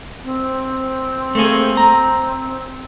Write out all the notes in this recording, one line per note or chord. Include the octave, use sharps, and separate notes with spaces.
C4
A3 A#3 G#4
A#5